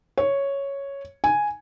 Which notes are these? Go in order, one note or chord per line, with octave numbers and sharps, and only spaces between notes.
C#5
G#5